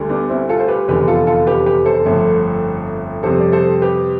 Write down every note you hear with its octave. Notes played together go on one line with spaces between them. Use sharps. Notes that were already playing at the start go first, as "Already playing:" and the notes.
Already playing: D2 D3 G3
B3 D4
C4 E4
F4 A4
C5
G4 B4
F1 E2 D3 G4 B4
F4 A4
F4 A4
G4 B4
G4 B4
A4 C5
G1 F2 D3 A3
F2 C3 G3 A4 C5
D5
A4 C5
G4 B4